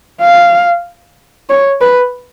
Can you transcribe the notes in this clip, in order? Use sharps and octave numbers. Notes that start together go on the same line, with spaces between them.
F5
C#5
B4